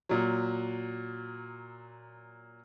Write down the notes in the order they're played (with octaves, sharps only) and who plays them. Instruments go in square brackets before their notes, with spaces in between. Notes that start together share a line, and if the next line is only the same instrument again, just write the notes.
[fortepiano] A#2 F#3